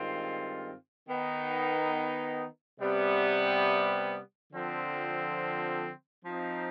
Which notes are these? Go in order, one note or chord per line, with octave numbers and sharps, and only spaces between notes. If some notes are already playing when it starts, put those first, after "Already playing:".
Already playing: G2 D#3 G#3 C4 F4
D#3 B3 D#4
C3 G3 B3
D3 F3 C4
F3 C4 D#4